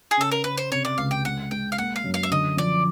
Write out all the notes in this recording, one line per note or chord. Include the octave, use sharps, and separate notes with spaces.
G#4
C#3 A4
A#4
C#3 B4
C5
C3 C#5
D5
C#2 F5
G5
G#3 F#5
G#3 G5
F5
A#3 F#5
F5
F#2
F5
E5
D3 D#5
F3 D5